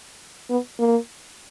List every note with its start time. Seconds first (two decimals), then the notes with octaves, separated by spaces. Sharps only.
0.50 B3
0.79 A#3